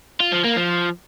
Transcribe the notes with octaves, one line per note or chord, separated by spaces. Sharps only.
F4
F3
A#3
F3